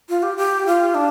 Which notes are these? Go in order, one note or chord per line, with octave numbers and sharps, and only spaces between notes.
F4
G4
G4
F4
D4